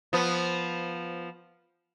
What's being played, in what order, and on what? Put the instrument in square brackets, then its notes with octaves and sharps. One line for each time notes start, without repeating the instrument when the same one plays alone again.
[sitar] F3 B3